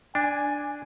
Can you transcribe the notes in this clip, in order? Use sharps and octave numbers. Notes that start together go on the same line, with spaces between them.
D4 G#5